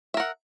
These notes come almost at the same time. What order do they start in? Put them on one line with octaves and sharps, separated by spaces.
E5 A#4 F#5